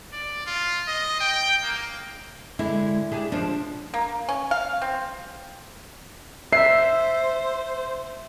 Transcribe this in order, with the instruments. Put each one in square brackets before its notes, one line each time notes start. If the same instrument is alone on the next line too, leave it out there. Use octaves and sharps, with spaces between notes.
[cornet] D5
F4
D#5
G5
A#3
[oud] D3 G#3 [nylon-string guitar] E4
[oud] D4 G4 G#4
[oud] F3 C5 [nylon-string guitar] D4
[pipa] A#3
C#4
F5
C4
[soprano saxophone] C5 [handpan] E5 [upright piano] C7